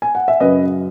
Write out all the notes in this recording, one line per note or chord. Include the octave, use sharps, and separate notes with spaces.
G#5
F#5
E5
F#2 C#3 F#3 B4 D#5